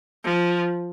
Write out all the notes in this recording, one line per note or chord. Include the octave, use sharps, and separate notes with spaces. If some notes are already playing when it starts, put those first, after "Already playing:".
F3